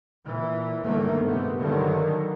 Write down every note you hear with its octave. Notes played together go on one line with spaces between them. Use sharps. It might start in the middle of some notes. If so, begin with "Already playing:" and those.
A#2 E3
G1 G#2 D#3 A3 A#3
C3 B3
G2 D3 D#3 F#3